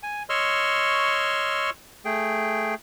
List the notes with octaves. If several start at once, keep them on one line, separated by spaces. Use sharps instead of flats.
G#5
C#5 D#5 C6 C#6 E6 F6
A3 G#4 G5